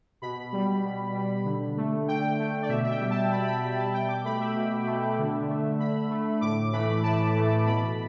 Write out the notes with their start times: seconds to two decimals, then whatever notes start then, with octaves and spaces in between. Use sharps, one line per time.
0.22 B2 B5
0.53 G3
0.84 B2
1.14 G3
1.45 D3
1.77 A3
2.07 D3 G5
2.39 A3
2.62 D5
2.69 B2 E5
2.83 E5
2.90 G5
3.00 G3
3.10 A5
3.31 B2 B5
3.47 B5
3.62 G3 B5
3.79 A5
3.94 B2 G5
4.08 D6
4.24 A3 B5
4.40 E5
4.56 B2
4.87 A3
5.18 D3
5.48 A3
5.79 D3 B5
6.10 A3
6.41 A2 D6
6.72 E3 A3 B5
7.03 A2 A5
7.34 E3 A3
7.65 B2 B5